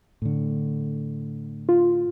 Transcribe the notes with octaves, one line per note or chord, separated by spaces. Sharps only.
A2 D3
F4